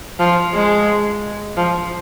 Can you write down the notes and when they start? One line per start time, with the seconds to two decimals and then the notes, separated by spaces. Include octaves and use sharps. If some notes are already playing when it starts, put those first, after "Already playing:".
0.19 F3
0.54 G#3
1.57 F3